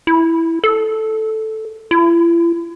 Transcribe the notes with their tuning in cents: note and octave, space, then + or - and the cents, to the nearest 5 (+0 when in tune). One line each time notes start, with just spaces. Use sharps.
E4 +0
A4 -5
E4 +45